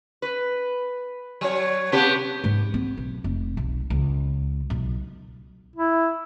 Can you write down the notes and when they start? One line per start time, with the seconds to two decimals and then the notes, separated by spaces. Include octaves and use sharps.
0.22 B4
1.41 F#3 C#5
1.92 C3 B3 G4
2.44 G#2
2.74 C4
2.97 B1
3.24 F1
3.57 B1
3.90 C#2
4.70 B1
5.76 E4